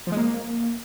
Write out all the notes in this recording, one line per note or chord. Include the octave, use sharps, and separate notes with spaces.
F3
G#3
A#3